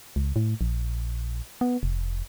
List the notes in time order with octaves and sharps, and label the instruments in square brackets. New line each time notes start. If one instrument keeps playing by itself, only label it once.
[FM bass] C#2
A2
A#1
B3
F1